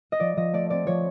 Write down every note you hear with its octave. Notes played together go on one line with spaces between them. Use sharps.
D#5
F3 D5
F3 D#5
A3 D5
C4 D5
F3 C#5